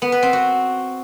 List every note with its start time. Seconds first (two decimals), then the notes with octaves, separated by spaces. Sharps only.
0.02 B3
0.12 B4
0.23 C4
0.33 F#4